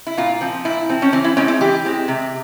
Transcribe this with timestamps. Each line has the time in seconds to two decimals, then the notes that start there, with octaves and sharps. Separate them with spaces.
0.07 E4
0.17 A#2 F4
0.41 F3 C4
0.65 A#2 E4
0.89 F3 C4
1.02 C#4
1.12 E3 C4
1.24 E4
1.37 G#3 C4 C#4
1.48 E4
1.61 E3 G4
1.85 G#3 C4
2.08 C3